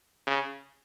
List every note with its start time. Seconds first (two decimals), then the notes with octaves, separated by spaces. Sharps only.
0.27 C#3